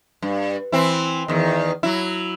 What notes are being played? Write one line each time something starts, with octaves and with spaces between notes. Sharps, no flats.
G2
E3 C4 E4
E2 D#3
F#3 E4